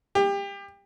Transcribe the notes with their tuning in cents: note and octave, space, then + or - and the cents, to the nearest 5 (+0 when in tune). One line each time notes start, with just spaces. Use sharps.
G4 +25